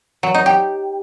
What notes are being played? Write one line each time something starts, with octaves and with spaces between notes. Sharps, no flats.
F#3
D#4
G4